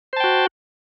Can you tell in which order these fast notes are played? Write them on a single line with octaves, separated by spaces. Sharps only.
C5 A5 G5 F#4